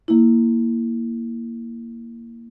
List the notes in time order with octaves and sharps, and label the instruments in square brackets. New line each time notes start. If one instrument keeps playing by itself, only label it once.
[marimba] A#3 E4